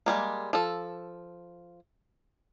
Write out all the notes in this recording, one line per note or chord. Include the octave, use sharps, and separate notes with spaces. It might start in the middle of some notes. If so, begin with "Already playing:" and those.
G3 G#3 A#3
F3 A4